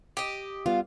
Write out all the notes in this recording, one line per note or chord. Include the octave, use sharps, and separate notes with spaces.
G4 D#5
G3 B3 F4 F5